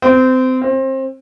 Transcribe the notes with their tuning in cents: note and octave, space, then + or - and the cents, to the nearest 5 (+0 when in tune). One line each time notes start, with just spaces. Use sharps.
C4 -25
C4 +25